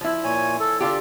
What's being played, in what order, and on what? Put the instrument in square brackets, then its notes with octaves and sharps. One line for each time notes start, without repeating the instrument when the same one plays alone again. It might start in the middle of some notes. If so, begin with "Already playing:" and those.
[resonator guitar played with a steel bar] F3 E4
[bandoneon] A#2 C#5 G#5
A4
[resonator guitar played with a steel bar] D3 F4 G4 [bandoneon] A4